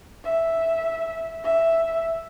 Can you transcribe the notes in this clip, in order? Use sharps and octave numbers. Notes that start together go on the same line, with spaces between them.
E5
E5